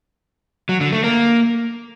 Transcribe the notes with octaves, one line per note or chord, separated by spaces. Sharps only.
F#3
D3
A3
A#3